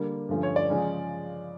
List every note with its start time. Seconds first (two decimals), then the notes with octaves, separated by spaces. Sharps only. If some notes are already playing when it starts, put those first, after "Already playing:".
Already playing: D3 G3 A#3 D4
0.29 G2 D3 F3 A3 C#4
0.43 C#5
0.56 D5
0.70 C#3 F3 G#3 C#4